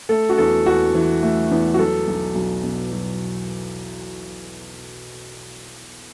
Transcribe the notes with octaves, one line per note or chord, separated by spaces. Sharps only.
A3 A4
F#4
E2 A4
E2 F#4
E3
A3
E2
F#4
F#3 A4
B1
B1
B2
F#3